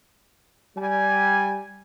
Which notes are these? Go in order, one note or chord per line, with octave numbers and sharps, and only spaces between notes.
G3 G#5